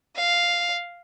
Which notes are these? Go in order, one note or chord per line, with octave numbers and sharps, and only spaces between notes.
F5